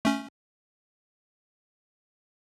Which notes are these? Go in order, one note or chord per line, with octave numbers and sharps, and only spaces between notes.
A3 C#4